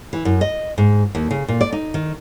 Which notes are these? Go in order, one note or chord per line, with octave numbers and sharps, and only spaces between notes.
E3
F#2
D#5
G#2
D#2
C#3
A#2
D5
D#4
D#3